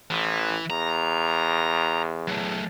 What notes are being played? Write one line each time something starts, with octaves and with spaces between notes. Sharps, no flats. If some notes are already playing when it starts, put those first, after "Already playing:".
A1 E3
E2 A#5
F#3 A3